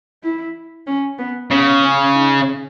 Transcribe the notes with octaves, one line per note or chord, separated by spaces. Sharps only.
E4
C#4
B3
C#3 B3
C#4
D#4